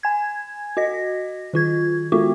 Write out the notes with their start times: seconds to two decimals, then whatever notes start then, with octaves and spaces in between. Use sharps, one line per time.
0.03 G#5 G#6
0.77 F#4 D#5 A#6
1.53 D#3 F4 G#6
2.12 G#3 B3 F4 F#4